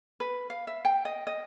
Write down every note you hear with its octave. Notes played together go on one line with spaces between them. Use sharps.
B4
F5
E5
G5
D#5
D#5